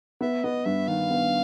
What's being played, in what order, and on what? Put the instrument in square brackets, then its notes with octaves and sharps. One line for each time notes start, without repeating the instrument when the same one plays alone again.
[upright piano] B3 [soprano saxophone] E5
[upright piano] B3 [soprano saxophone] D#5
[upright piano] G2 [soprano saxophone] E5
[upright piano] D#3 [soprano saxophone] F5
[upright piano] B3